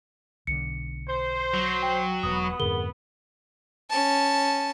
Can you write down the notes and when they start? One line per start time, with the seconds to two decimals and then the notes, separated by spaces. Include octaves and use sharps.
0.47 B1 D3 C#7
1.07 C5
1.54 F#3
1.83 G5
2.23 E1 B3 D#6
2.59 F2 G#2 D3 G#4 A#4 G7
3.90 C#4 A5